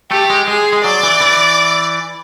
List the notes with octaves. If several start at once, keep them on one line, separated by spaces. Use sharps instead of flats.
A3 G4
G#3
G#3 G#4
G#3
F#3 D5
E3
E3